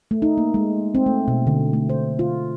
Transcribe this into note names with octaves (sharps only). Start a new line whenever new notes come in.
A3
D#4
A#3
G#3
C4
A3
B2
D3
A3
C5
F4